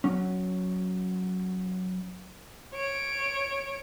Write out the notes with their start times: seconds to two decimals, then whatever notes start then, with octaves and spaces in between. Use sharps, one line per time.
0.04 F#3 C#4
2.74 C#5 D7